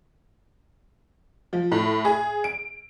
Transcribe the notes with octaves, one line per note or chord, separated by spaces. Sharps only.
F3
A2
G#4
D7